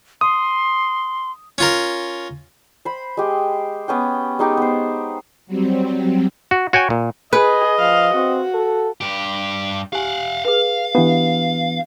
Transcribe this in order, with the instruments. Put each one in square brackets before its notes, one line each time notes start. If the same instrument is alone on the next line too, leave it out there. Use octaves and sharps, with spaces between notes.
[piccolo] C6 [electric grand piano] D#6
[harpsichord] C#4 F4 A#4
[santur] C5 B5
G#3 G4
B3 C#4 G5
G#3 D#4 G4
B3 C5
[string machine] F#3 G3 C4
[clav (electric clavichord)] F#4
F#4 C#5 G5 G#5
A#2
[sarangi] G#4 [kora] B4 [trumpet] D#5
[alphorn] F3 [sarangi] F5
[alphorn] C4 [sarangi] F#4
[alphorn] A4
[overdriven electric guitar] G2 G4
[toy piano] G4 G#5 [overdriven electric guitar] F5 F#5
[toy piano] G#4 B4 [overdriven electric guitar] F5
[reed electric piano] E3 B3 [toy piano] D4 G4 F#5